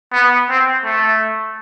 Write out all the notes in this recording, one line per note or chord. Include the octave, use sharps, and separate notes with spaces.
B3
C4
A3